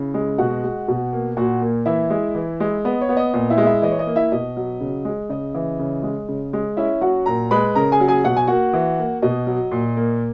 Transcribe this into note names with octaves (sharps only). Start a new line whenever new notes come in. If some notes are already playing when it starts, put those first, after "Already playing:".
Already playing: C#3 E4
G#3
B2 F#4 F#5
G#3
B2
A#3
A#2 F#4 F#5
A#3
E3 E4 E5
G#3
E3
G#3
B3 D#5
C#5
B3
D#5
A#2 D#5
E4 E5
G#3
E4 E5
E3 D#5
C#5
D#5
A#3
E4 E5
B2 D#5
F#3
C#3
G#3
C#3 D#5
E3
C#3
G#3
C#3
G#3
C#4 E4 E5
F#3 F#4 F#5
A#2 A#4 A#5
G#3 B4 B5
C#3 A#4 A#5
G#4 G#5
F#3
G#4 G#5
B2 F#5
G#5
A#3 F#4 F#5
E3
A#3
B2 D#5
F#3
A#2
A#3